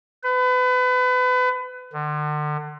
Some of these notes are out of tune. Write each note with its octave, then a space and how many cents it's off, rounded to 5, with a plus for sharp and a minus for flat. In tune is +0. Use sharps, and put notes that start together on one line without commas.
B4 +30
D3 +40